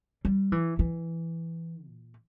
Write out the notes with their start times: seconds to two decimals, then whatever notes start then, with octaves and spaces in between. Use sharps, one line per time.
0.25 G3
0.52 E3
0.79 E3
1.86 A#2